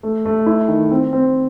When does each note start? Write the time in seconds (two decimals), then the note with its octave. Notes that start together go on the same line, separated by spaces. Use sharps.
0.03 A3
0.25 A3
0.47 E4
0.68 D#3
0.91 C4
1.13 C4